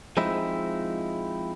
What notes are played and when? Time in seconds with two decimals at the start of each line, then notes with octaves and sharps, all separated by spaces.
0.17 F3 G#3 C4 D#4 E4